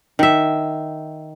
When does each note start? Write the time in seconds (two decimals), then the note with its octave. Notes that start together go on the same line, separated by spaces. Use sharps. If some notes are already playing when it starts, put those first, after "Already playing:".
0.19 D#3 E5